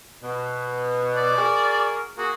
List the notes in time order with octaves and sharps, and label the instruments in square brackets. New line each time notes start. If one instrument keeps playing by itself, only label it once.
[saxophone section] B2
[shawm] D5
[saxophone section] F#4 G#4 A#4
[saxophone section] A#3 G#4 [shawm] F#4